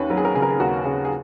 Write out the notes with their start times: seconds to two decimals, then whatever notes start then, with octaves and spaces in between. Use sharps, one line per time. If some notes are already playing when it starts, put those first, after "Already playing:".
Already playing: D#2 C#4 B4
0.10 F#3 A#4
0.17 G#4
0.25 A#4
0.35 C#3 G#4
0.42 A#4
0.50 G#4
0.60 D#2 F#4
0.85 C#3 G#4
1.05 G#4